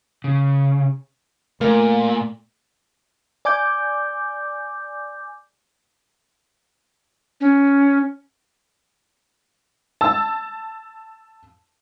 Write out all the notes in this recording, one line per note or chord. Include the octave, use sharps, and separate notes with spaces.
C#3
A#2 A3 A#4 D5 A#5
D5 G#5 D6 G6
C#4
A5 E6